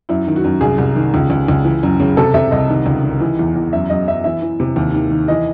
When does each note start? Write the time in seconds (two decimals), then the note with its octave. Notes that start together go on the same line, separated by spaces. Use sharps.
0.09 F#2 E4
0.27 D#3
0.36 F#4
0.44 F#2
0.61 C2 G#4
0.78 C2
0.96 D#3
1.14 C#2
1.30 C#2
1.48 C#2
1.65 E3
1.83 F#2
2.00 C#3
2.17 C3 A4
2.34 C3 E5
2.51 C2 D#5
2.69 D#3
2.86 C#2
3.04 D#3
3.20 E3
3.39 E2
3.55 E2
3.73 F#2 E5
3.90 F#2 D#5
4.07 F#2 E5
4.24 E3 E5
4.42 E3
4.60 C3
4.76 D#2
4.94 D#3
5.11 D#3
5.28 E3 D#5